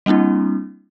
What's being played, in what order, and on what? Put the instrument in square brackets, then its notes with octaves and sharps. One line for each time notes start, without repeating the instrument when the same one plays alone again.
[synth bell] G3 A#3 C4 D4 E4